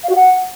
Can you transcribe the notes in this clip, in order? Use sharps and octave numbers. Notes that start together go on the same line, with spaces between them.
F5
F#4
F#5